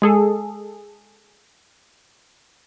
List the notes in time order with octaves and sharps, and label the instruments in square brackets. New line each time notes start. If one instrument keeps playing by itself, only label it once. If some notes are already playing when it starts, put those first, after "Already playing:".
[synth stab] G#3 G#4 A4